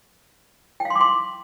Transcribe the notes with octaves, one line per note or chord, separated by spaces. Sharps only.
G5
F5
C6
D6
C6